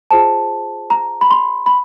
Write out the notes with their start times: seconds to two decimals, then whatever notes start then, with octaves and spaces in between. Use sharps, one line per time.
0.11 F4 G#4 C5 A5
0.90 A#5
1.21 B5
1.31 C6
1.66 B5